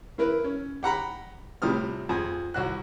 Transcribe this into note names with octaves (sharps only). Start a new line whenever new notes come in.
A#3 E4 A#4 B4
C#4
G4 F#5 A#5 B5
A2 C3 F3 G3 D#6 F6
F2 G#4 G#5
C2 F#4 F#6